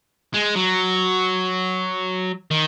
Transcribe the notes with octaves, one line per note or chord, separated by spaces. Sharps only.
G#3
F#3
D#3